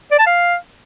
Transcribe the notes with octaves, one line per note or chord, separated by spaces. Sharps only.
D5
A5
F5